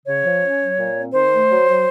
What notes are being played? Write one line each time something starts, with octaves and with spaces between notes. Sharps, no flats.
C#3 C#5
F3
C#4
F#3
A#2
C4
D#3 C5
A3
F#3
F#3